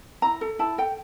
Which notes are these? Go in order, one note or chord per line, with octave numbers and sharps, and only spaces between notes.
E4 A#5
A4
E4 A5
A4 G5